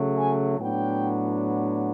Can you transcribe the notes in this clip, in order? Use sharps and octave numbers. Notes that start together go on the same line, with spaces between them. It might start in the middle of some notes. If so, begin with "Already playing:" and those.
Already playing: C#3 F#3 A3
G#5
A2 F#3 B3 D4 G5